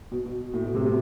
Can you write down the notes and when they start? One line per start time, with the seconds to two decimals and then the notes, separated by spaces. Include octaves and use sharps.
0.11 B2
0.26 B2
0.54 A2
0.65 B2
0.75 C3
0.85 C3